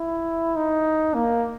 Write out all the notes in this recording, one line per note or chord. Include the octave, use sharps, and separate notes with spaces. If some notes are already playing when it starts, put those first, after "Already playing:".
Already playing: E4
D#4
A#3